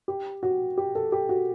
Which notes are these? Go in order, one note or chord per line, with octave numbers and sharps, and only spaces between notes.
G4
F#4
G4
A4
G4
F#4